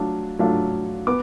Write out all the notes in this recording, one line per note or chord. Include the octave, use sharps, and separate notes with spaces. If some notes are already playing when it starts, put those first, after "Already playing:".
Already playing: F#3 A3 D4 F4
F#3 A3 D4 F4
B3 D6